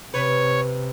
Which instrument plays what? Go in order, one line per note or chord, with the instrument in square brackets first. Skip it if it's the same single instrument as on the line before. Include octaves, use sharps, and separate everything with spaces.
[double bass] C3 [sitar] B4 [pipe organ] C#5